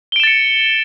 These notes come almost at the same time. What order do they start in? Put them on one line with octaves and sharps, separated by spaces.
G7 D7 E7 A6 C#7